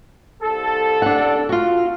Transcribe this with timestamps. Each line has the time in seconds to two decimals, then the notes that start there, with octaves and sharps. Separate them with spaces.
0.42 C2 A4
1.02 D4 F#5
1.49 F4 F#4